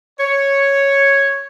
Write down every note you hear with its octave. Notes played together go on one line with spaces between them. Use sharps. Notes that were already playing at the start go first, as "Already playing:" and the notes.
C#5